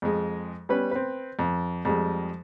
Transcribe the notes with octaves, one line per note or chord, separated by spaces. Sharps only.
F2 G#3
G3 B3 C#4 B4
C4 B4
F2
F2 G3 G#3